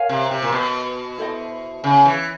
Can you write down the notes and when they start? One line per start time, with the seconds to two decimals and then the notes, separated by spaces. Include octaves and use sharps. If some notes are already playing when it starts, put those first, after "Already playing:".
Already playing: A#4 C#5 F5 G#5
0.09 C3
0.31 C3
0.42 A#2
0.52 B2
1.18 E4 A4 C5 D#5
1.84 C#3
2.06 E3